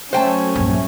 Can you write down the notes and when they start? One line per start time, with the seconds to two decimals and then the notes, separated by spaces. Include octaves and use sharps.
0.13 F#3 A3 C#4 C5 G5 A5
0.55 A#1 G2